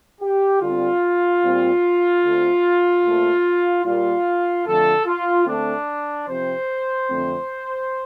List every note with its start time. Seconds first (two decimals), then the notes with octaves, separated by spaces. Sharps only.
0.21 G4
0.61 D3 G3 C4 F4
1.42 A#2 G3 C4
2.22 D3 A3 C4
3.03 A#2 A3 C4
3.85 A#2 G3 A#3 F4
4.65 F2 D3 F3 A3 A4
5.05 F4
5.46 D3 A3 C4 D4
6.27 C3 F3 C4 C5
7.08 F2 D3 A3 C4